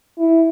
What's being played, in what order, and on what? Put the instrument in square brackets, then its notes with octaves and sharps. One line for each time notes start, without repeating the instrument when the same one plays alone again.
[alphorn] E4